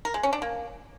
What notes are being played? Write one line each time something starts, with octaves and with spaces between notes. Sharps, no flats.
A#4
G#3
C#4
D4
A#3